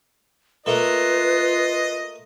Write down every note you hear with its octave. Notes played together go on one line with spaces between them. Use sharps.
A3 A#3 F4 B4 D#5